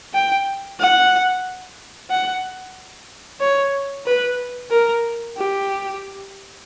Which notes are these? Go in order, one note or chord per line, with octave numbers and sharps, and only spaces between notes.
G5
F#5
F#5
C#5
B4
A#4
G4